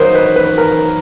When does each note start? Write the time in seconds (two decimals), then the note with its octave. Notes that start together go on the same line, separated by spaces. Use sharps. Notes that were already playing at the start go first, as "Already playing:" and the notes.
Already playing: D#3 F#3 A#3 D#4 C5 C#5
0.15 B4
0.36 B4
0.58 A#4